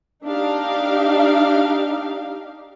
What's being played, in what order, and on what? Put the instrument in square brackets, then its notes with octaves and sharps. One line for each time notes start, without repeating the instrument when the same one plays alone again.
[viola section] D4 D#4 G4 F5